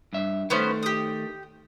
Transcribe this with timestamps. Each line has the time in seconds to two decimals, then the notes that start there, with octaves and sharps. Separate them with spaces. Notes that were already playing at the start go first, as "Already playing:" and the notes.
0.13 G2 E5
0.50 D#3 A3 B3 C#4 C5
0.83 G4 D#6